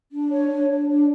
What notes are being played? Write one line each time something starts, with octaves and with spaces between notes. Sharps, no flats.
D4
C#5
D4
D4
D4